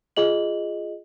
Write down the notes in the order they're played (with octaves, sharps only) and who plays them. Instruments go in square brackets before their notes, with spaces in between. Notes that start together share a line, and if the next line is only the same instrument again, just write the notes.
[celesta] F4 G#4 D#5 F#7